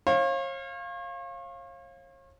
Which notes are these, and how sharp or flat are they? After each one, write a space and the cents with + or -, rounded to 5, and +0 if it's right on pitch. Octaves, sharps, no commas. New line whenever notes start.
C#5 -40 F5 +0